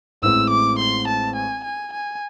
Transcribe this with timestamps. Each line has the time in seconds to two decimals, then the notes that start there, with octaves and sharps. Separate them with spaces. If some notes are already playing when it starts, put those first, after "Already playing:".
0.22 A1 A2 G#3 C4 E6
0.51 D6
0.79 C6
1.08 A5
1.36 G#5
1.65 G#5
1.93 G#5